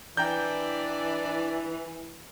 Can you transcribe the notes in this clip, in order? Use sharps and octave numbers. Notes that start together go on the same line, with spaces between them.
E3 D4 G5 A#5 G6